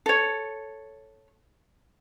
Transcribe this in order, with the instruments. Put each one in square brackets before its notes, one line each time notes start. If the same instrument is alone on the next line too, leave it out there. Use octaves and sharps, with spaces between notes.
[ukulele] A4 C#5